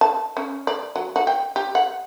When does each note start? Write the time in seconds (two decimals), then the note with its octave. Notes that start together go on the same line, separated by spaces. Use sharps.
0.01 A5
0.37 C#4
0.67 D5
0.96 F#3
1.16 F#4
1.27 G5
1.56 G4
1.75 F#5